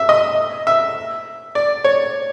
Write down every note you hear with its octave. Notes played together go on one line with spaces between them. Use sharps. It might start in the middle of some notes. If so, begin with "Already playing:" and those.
Already playing: E5
D#5
E5
D5
C#5